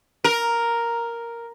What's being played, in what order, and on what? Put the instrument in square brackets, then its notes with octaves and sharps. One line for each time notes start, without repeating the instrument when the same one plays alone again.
[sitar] A#4